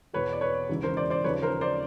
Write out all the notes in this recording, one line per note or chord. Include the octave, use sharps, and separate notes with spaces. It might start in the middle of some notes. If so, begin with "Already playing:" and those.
E2 B2 B4 C#5
D5
B4 C#5
E1 D#2 C#3 E3
A#4 C5
C5 D5
C5 D5
D#2 C#3 F3 B4 C#5
A#4 C5
C5 D5